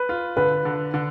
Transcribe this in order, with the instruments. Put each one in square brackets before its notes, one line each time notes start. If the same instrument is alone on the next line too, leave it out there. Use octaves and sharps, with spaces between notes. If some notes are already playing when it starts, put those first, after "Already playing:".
Already playing: [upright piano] B4
[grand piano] F4
[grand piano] D3 [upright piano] B4
[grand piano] D3
D3